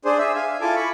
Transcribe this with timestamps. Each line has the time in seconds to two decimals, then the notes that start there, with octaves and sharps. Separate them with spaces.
0.05 D4 G#4 C5
0.19 G#4 E5
0.35 F5 G#5
0.48 E5 F5
0.61 E4 F4 A4 G#5 A5 D6
0.75 B5 C#6